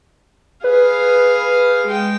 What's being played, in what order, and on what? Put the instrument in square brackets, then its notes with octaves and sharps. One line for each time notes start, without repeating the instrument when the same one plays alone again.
[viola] G#4 F5 [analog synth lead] B4
[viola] G#3 G5